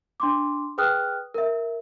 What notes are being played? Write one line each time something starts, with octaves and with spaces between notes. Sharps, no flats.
D4 C6 D6
G#4 B4 G5 D#6 F6 F#6
A#4 E5